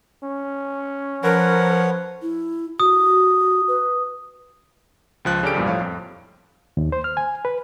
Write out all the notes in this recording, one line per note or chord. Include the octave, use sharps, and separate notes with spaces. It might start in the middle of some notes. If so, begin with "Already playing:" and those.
C#4
F3 A#4 B4 C#5 F#5
E4
F#4 D#6
B4
C#2 F3 F#6
C#3 C#4 D4 G4 A4 D7
B1 E2 G2 A#2 F3 G3
A2 F3 C#5 F5
F2
D#2
C5
F6
G#5
B4